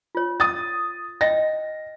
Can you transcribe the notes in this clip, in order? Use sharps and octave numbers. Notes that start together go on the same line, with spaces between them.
F4 C#5
D#6 A6
D#5 G5 A#6